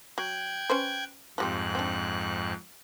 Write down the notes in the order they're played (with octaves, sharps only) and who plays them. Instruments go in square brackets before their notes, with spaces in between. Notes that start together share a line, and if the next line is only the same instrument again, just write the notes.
[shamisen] F#3 [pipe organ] G5 F#6 G#6
[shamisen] C#4 B4 C5
[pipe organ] F2 G#2 F#6 [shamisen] F3 G3 C4
[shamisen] C4 D4